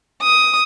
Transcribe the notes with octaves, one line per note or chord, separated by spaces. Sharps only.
D#6